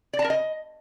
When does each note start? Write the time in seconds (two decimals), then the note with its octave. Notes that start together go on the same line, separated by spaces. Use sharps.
0.13 D5
0.19 A5
0.24 A#4
0.30 D#5